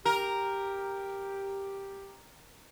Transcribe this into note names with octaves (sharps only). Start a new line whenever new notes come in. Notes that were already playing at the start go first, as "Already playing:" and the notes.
G4 A#4